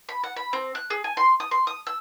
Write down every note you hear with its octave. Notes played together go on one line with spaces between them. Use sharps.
B5
F#5
B5
C4
F#6
G#4
G#5
C6
D#6
C6
D#6
E6